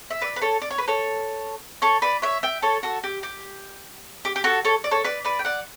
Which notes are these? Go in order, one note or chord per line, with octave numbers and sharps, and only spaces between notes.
E5
B4 D5
B4
A4 C#5
D5
C#5
B4
A4 C#5
A4 C#5
B4 D5
C#5 E5
E5 G5
A4 C#5
F#4 A4
G4
G4
G4
G4
F#4 A4
A4 C#5
D5
A4 C#5
B4 D5
B4 D5
G5
D5 F#5